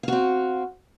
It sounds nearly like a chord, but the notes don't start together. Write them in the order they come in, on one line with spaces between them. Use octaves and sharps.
F5 F#4 C4